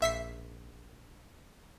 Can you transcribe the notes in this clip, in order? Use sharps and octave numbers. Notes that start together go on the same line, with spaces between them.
A#1 E5 B6 C7